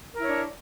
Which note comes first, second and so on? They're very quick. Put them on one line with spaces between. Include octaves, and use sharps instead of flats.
A#4 E4 C#5 D4